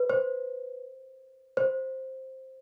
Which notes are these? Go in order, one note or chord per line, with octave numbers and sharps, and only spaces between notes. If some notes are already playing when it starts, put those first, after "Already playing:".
Already playing: B4
C5
C5